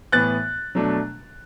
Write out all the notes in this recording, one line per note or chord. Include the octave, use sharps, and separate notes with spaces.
A2 E3 B3 F#6 A6
B2 F#3 A3 D4